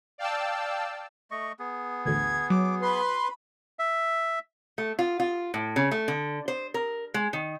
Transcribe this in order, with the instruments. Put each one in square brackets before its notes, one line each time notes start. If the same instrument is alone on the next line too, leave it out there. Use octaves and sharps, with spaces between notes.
[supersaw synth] D5 F5 G5 A5 E6
[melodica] A3 D#5 C#6
B3 G#4
[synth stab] A1 D2 [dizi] G#6
[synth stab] F#3 [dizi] D6
[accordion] B4 C6 [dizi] B5
[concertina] E5
[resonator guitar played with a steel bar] A3
F4
F4
A2
C#3
A3
D3
C5
A#4
G#3
D#3